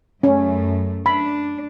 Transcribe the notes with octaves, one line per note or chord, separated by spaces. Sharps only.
F#2 A3 C#4
D4 B5